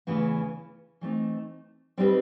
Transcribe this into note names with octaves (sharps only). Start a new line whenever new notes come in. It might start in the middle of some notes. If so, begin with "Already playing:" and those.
E2 C#3 E3 A3
E3 A3 C4 D#4
G3 C4 D#4 G4 B4